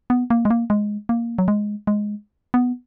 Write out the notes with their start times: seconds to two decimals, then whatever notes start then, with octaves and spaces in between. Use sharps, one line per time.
0.10 B3
0.30 A#3
0.45 G#3
0.50 A#3
0.70 G#3
1.09 A#3
1.39 F#3
1.48 G#3
1.87 G#3
2.54 B3